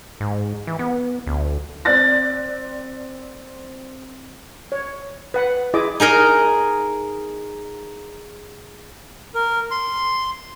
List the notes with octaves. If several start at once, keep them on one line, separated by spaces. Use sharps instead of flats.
G#2
E3
B3
D2
C4 D5 F#6 A6 A#6
C#5
B4 F#5 B5
E4 G#4 D#5 D6
D#4 G#4 A#4 D#5
A#4
C6